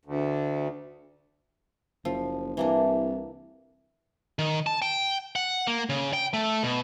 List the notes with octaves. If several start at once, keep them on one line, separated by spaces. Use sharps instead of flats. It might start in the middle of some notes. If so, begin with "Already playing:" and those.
D2
F#1 F3
C2 E3 A#3 D4
D#3
A5
G5
F#5
A#3
C#3
G5
A3
B2